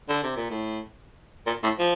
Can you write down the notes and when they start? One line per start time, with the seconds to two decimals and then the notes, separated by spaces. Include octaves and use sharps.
0.09 D3
0.23 C3
0.36 A#2
0.50 A2
1.46 A#2
1.63 A2
1.79 F3